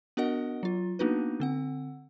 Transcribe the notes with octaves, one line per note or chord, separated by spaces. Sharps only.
B3 D4 F#4 A#4 D#5 F#5
F#3 F4
A#3 B3 D4 D#4 F#4 B4
D3 C4 F#5